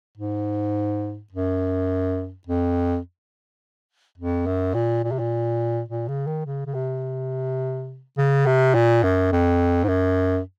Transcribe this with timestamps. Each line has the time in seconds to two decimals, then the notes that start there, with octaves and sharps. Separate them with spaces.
0.18 G#2
1.32 F#2
2.47 F2
4.18 F2
4.46 F#2
4.74 A#2
5.04 A#2
5.12 C3
5.19 A#2
5.88 A#2
6.08 C#3
6.27 D#3
6.46 C#3
6.66 C#3
6.74 C3
8.17 C#3
8.46 C3
8.74 A#2
9.03 F#2
9.32 F2
9.84 G#2
9.88 F#2